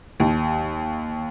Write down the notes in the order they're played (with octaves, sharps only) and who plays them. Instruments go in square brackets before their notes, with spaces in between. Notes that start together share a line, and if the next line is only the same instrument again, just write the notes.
[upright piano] D#2